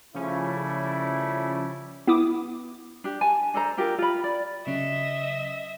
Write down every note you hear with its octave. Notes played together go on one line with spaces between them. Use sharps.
C#3 F3 G3 A3 C#4 E4
B3 E4 D6 D#6
D4 G4
G#5 A5
D4 A4 C5 A#5
D4 F4 G4 A#4
F4 B5
D5
C#3 F#3 C#4 D#5 E5